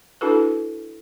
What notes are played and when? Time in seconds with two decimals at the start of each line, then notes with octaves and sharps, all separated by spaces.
0.21 D4 E4 F#4 A4 B4